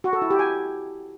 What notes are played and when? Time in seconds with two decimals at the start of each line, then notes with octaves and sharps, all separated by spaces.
0.04 F#4
0.13 A4
0.22 E4
0.30 G4
0.39 G#5